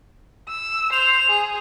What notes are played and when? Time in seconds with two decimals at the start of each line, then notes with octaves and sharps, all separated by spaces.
0.49 E6
0.92 C5 F7
1.29 G#4